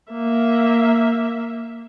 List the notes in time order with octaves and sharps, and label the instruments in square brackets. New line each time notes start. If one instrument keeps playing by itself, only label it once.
[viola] A#3 E5